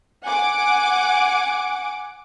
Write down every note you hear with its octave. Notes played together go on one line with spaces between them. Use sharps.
F#5 G#5 D6